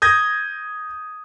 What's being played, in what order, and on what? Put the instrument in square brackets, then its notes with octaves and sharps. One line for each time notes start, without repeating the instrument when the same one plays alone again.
[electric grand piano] D#6 G6 G#6 A#6